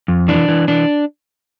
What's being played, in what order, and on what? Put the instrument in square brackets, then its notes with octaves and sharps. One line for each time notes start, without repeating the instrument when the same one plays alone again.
[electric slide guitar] F2
E3 D4
E3
E3 D4